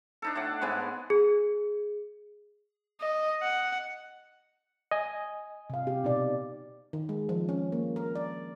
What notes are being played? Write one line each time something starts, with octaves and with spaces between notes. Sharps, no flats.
D4 D#4 A4
A2 D5 F#5
G#2 G#3 B3 G#5
G#4
D#5
F#5
D#5 G#5
C3 F5
G4
B2 D#4 D5
D#3
G#3
F3
C#4
A#3
A#4
D5